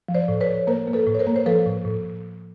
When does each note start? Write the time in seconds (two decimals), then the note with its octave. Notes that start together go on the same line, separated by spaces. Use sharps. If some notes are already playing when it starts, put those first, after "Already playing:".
0.08 F3
0.14 C5 D5
0.28 A2
0.41 B4 C#5
0.47 A2
0.67 A#3 A#4 C5
0.87 A#3
0.93 A4 B4
1.06 A2
1.15 C#5
1.19 A#4 C5
1.27 A#3
1.36 C5
1.46 F3 A4 B4
1.66 A2
1.85 A2